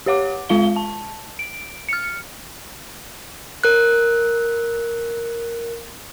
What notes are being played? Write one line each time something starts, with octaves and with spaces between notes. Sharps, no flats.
G4 C#5 F#5 D6
G#3 F4 F5 G7
A5
D7
F6 C#7
A#4 F#6